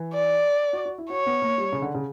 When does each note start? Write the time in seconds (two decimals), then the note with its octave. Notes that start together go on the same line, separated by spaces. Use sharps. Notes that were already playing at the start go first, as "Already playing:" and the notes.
Already playing: E3
0.13 D5
0.73 F#4
0.85 F#4
0.98 E4
1.10 F#4 C#5
1.26 B3
1.42 A#3
1.58 G3
1.73 C#3
1.82 D3
1.95 C#3